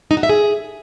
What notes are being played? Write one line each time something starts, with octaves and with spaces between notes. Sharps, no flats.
D#4
F#4
E5
G#4